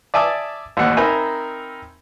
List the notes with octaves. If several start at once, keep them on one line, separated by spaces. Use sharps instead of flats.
D5 E5 G#5 A5 D6 D#6
A1 D#2 F#5
C4 D#4 A#4 E5 G#5 B5